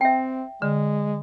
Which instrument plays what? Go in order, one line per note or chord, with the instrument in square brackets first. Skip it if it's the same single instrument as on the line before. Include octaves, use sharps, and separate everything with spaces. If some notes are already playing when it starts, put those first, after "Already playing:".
[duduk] C4 [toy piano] E5 G5
[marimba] D3 [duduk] G#3